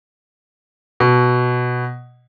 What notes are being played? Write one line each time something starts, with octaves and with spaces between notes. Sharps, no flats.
B2